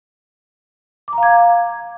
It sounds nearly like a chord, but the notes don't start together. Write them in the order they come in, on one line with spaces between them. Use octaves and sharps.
D6 A#5 F5 G#6